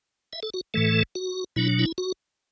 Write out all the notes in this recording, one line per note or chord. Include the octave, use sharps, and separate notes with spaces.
E5
A4
F#4
A2 E3 A3 A4
F#4
B2 F#3 D4 E4
E4
F#4